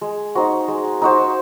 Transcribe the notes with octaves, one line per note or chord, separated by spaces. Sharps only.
G#3
D#4 F#4 C5
G#3
D#4 F#4 C5